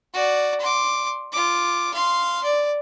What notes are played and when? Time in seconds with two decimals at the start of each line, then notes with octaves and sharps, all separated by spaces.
0.13 F#4 D5
0.61 C6 D6
1.32 F4 D6
1.94 F5 C6
2.44 D5